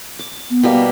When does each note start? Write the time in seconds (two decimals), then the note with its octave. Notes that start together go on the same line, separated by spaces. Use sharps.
0.19 D6
0.50 B3
0.63 B2 G3 A#3